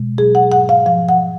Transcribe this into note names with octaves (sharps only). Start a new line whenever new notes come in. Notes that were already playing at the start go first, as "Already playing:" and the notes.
Already playing: B2 G#3
F#3 G#4
F#5
G#2 F#5
F5
F3 F5
F#5